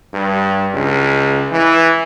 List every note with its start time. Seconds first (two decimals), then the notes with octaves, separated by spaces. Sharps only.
0.14 G2
0.74 C#2
1.52 E3